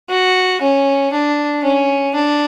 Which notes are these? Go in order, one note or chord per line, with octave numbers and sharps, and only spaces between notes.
F#4
C#4
D4
C#4
D4